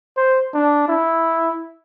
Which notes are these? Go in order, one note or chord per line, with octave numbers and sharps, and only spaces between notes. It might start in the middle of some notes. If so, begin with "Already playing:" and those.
C5
D4
E4